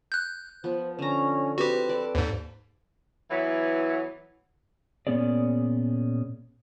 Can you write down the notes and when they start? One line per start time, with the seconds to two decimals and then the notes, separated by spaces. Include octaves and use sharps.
0.12 F#6 G6
0.64 F3 B3 C5
0.99 D3 C#4 A#5
1.58 C4 F#4 G4 B4
1.89 A4 D5
2.15 D#2 G#2
3.31 E3 F#3 B3 E4
5.07 A#2 E3 B3 C#4 G#4 D5